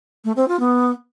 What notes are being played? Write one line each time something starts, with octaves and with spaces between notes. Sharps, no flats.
A3
C4
F4
B3